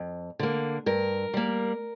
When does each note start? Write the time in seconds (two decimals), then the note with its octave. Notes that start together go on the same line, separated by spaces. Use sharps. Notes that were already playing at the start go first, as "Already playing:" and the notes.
Already playing: F2
0.39 D3 A#3
0.86 G2 A#4
1.34 G3 A#3